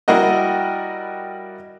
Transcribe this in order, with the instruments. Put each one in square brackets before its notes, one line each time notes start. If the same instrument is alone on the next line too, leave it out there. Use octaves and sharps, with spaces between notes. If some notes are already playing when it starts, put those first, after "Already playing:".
[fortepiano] G3 E4 F#4 A#4 D#5